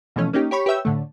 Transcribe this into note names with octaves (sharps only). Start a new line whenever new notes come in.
B2 E3 F3 A3 C#4
A#3 C#4 D#4 G4
G4 C#5 B5 C#6
G4 B4 C#5 E5 G5 E6
A2 D3 A3